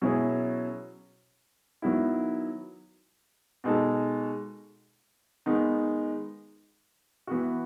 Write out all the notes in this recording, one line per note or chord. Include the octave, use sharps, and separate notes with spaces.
B2 F#3 C#4 E4 G#4
D#3 F#3 B3 E4
B2 G#3 D#4 A4
D#3 G#3 B3 D#4
E3 B3 F#4